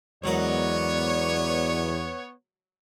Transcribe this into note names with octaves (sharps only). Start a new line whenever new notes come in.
E2 G#2 F#3 B3 A#4 C#5 D5